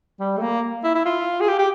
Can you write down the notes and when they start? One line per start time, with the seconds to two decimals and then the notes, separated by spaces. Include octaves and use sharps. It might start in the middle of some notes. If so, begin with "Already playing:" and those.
0.20 G3
0.37 A3
0.42 A#3
0.84 E4
0.95 E4
1.05 F4
1.41 G#4
1.48 G4
1.59 G4